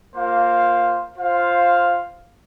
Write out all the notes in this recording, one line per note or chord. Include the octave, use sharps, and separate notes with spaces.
A#3 F4 C5 F5
F4 C5 F5